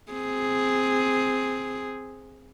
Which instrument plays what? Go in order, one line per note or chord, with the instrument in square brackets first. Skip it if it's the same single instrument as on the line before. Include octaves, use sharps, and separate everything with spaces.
[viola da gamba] C4 G#4